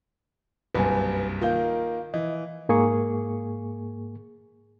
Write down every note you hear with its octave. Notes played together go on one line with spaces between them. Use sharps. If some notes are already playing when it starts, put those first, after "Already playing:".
F#1 C2 G2 B4 G#5
D#3 A#3 F4 F5 G6
E3 D#5
G#2 A#3 G#4 C#6